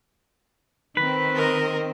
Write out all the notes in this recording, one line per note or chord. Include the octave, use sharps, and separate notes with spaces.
D#3 C4 B4
A#4 D#5